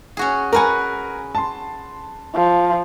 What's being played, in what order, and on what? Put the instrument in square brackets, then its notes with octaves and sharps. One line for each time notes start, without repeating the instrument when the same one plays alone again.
[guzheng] C#4 F#4 G#4
[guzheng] F#4 B4 F#5 [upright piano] A#4 G#5
[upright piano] A5 C6
[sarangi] F3